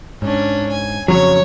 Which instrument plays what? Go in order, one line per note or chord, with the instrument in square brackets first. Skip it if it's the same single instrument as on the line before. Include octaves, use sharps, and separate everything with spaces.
[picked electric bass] G#2 [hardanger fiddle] C#4 D4
[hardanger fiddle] G#5
[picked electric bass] F2 C#3 [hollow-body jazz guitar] F#3 [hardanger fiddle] C#5